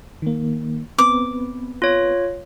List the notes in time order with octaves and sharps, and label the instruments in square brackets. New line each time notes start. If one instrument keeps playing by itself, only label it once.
[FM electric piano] D#3 A#3
[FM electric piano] B3 C4 B4 [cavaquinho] D6
[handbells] F4 C#5